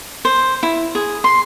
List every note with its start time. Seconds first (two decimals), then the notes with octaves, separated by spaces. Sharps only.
0.25 C5
0.63 E4
0.95 G#4
1.24 C6